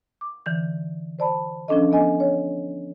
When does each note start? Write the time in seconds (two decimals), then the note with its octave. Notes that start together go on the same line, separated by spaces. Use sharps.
0.21 D6
0.46 D3 E3 G6
1.19 C5 D5 A5 B5
1.68 F3 C#4 D4 A4 D#5
1.92 B3 A4 D#5 G#5
2.20 C#5